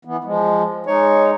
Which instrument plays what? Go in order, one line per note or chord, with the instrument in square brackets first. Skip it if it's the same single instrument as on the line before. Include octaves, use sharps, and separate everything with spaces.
[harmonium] E3 B3
F3 G#3
[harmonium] G#3 D#4 [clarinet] C#5